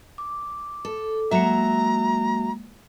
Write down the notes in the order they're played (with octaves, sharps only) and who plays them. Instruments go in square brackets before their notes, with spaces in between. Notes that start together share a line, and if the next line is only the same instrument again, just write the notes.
[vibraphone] D6
[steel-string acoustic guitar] A4
[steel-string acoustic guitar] F#3 E5 [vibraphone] G#3 A#3 [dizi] A#5